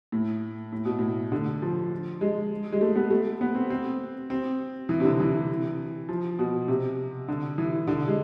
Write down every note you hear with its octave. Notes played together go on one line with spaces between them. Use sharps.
A2
A2
B2
A2
D3
F3
G#3
G#3
A3
B3
A3
B3
C4
C4
C4
E3
C3
D3
E3
F3
B2
C3
D3
E3
D3
G#3